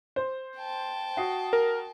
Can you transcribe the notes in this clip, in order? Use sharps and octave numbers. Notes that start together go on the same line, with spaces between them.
C5
G5 A5
F#4 D#6 C7
A#4